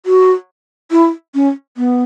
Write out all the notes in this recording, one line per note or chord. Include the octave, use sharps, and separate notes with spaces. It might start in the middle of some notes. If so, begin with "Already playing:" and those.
F#4
E4
C#4
B3